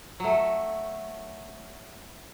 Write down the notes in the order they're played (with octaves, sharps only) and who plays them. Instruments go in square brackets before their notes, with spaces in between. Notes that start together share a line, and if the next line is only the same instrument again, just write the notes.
[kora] F#3 A3